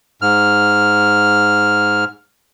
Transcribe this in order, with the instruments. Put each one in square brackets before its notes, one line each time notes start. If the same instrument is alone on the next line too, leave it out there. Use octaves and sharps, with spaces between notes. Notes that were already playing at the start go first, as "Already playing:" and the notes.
[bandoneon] G#2 F6